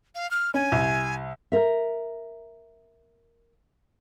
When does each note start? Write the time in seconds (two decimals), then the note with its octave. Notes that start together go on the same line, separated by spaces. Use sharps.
0.15 F5
0.31 F6
0.54 C#4 G#5
0.72 C2
1.52 A#4 E5